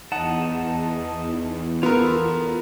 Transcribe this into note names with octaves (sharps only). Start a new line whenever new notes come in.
E2 D#4 F#5 A5
B3 F4 A4 A#4